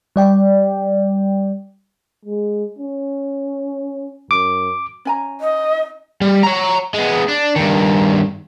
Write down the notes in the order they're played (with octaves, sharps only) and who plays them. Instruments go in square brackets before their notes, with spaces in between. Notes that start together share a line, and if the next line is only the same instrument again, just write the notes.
[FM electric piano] G3 D5 G5
[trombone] G#3
C#4
[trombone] F#2 [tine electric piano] D6
[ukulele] C#4 G#5 A#5
[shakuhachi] D#5
[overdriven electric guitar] G3
C#5 A#5
G#3 B3
D4
G2 D#3